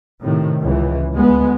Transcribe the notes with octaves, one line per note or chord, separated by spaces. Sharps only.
A2 C3 D#3
C#2 E3
D2 G#3 B3